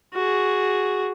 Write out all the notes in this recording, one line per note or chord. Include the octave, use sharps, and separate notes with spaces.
F#4 G#4